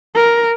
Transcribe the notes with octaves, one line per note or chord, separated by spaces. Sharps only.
A#4